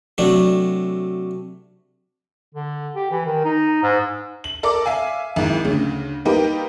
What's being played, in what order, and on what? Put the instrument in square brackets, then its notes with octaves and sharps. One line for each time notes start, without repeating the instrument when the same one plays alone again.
[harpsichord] C3 F#3 A3 D4
[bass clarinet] D3
G4
E3
D#3
D#4
G#2
[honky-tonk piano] F#7
A4 A#4 D5 D6
E5 F5 G#5
G#1 G#2 E4
D2 C#3
G3 A#3 D#4 G4 A#4 B4